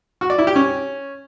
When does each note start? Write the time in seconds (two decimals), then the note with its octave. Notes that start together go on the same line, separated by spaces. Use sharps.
0.21 F#4
0.30 D5
0.38 E4
0.47 G4
0.56 C#4